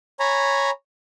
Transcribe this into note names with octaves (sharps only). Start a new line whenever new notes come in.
C#5 G#5 A#5 B5